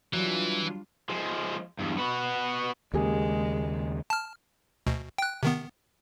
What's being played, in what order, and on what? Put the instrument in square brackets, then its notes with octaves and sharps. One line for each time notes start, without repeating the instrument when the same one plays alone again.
[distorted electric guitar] E3 [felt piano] F#3 [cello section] G3 D4 F4
[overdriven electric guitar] F3 G#3
E2 G2
B3 F#4
[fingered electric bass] D#2 C#3 [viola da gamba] G#3 [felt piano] A#3 G4 G#4
[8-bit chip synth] A5 F6
D2 B2
G5 F#6
C3 D#3 B3